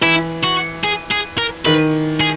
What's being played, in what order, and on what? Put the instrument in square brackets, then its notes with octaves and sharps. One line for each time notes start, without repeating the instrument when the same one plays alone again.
[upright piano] E3 [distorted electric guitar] E4
[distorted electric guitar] F#4
G#4
G#4
A#4
[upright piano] D#3 [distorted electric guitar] B4
[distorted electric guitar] G#4